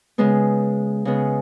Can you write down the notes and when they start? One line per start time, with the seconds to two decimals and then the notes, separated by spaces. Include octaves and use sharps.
0.18 C#3 G#3 B3
1.05 C#3 G#3 B3